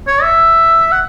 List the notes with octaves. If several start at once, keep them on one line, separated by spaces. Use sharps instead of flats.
C#5
E5
F#5